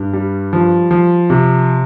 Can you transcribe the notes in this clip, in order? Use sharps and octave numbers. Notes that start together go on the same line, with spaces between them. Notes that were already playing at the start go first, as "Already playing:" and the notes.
Already playing: G2
G3
F3
F3
C3